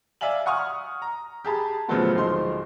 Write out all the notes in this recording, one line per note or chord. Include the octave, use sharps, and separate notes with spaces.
D5 E5 F5 G#5 F#7
F#5 G#5 C#6 D#6 F6
A#5
G4 G#4 A5 B5
A#2 C#3 F3 F#3 A3 B3
D1 F3 G#3 D#4 C6